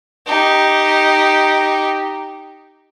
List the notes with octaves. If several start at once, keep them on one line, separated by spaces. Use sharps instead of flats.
D#4 G4